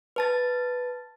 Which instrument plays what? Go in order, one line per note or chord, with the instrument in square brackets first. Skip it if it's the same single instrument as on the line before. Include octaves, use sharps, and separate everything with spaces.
[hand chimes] B4 A5 A6